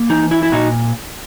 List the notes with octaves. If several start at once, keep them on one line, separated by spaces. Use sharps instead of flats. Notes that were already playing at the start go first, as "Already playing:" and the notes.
Already playing: A#3
E3 D#4
E4
E4
A#2 D#4 F#4